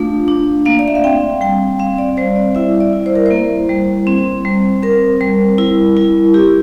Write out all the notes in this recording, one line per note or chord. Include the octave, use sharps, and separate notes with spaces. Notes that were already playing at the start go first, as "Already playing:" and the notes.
Already playing: A3 D4 F4 F5
D4
A#3 F5
D5
E5
F5
C4 G5
G3 G5
C4 F5
D5
G3 C5
D5
E4 E5
D5
E4
C5
A#4
A#3 C5
G3
C4
G3
C4 A#4
G3
E4
E4
E4 G4